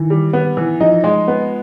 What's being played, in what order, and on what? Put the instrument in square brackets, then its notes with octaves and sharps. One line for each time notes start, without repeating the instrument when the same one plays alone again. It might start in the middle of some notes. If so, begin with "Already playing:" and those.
Already playing: [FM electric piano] D#3 [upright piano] E3
[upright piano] G3
B3
E3
[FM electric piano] F3 [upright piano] D#4
[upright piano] G#3
B3